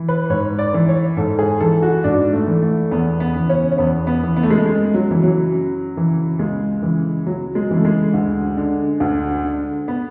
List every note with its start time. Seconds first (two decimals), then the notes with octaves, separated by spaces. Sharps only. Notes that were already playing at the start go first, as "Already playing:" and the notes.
Already playing: E3
0.09 B4
0.30 G#2 C#5
0.59 D5
0.74 E3
0.88 C#5
1.17 G#2 A4
1.39 G#4
1.60 E3 A4
1.82 F#4
2.04 G#2 D4
2.33 A3
2.48 E3
2.62 A3
2.91 E2 B3
3.20 B3
3.35 C#3 E3
3.49 C#4
3.72 C#4
3.78 E2 B3
4.07 B3
4.22 C#3 E3
4.37 B3
4.43 A3
4.50 G#3
4.57 A3
4.65 F#2 G#3
4.94 F#3
5.09 C#3 E3
5.23 F#3
5.52 F#2
5.96 C#3 E3
6.39 C#2 G#3
6.82 C#3 E3
7.26 C#2 F#3
7.55 G#3
7.70 C#3 E3
7.77 A3
7.85 G#3
8.14 D2
8.57 D3
9.00 D2
9.44 D3
9.88 B3